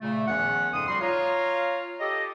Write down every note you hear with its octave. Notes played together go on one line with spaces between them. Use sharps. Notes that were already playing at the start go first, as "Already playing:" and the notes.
A#2 C#3 A3
E2 D#3 F3 B3 C#4 F#5
F2 G#2 C#3 C6 D#6
G3 F#4 C6
F4 C#5 F5 A#5
G4 A4 D#5